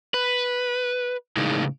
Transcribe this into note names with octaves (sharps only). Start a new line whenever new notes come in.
B4
A2 C#3 E3 G#3 A#3 D#4